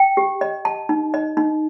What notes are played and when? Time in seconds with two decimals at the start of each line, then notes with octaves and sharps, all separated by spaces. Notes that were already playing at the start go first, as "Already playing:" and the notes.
Already playing: G5
0.17 G4
0.41 D#5
0.65 A5
0.89 D#4
1.14 D#5
1.37 D#4